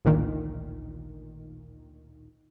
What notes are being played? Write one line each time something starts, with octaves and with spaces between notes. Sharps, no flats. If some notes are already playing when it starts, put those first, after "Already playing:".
A1 D2 A#2 D#3